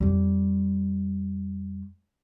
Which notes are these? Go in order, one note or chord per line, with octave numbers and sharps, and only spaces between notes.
F2 G3